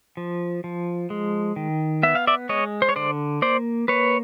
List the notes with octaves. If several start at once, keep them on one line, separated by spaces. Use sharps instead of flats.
F3
F3
G#3
D#3
B3 E5
F5
D5 E5
G#3 C#5 D#5
C5
C#5
D3 C5 D5
A#3 C5 D5
A#3 B4 C#5